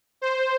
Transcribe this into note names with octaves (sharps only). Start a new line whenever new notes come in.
C5